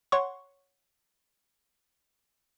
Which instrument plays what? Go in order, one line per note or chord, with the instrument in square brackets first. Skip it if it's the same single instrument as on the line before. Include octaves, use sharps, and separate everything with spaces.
[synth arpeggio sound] C#5 F#5 C6 C#6